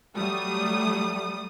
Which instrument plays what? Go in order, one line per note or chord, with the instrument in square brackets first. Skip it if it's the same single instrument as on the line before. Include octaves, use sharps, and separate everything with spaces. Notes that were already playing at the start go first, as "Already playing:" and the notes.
[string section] F#3 G3 A3 D#6